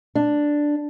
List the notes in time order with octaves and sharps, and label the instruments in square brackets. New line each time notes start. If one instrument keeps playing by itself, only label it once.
[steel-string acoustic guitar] D4